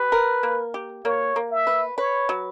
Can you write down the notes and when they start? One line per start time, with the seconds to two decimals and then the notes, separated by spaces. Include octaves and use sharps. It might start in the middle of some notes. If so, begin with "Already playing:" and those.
Already playing: G4 B4
0.12 A#4
0.43 A#3
0.74 G4
1.05 A#3 C#5
1.36 A#3
1.51 E5
1.67 B4
1.98 B4 C#5
2.29 F#3